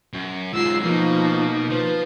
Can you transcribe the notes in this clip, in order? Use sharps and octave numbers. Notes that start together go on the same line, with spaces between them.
F#2
G#2 F#3 F4 E6 C7
B2 F3 A#3 D#4
F3 B4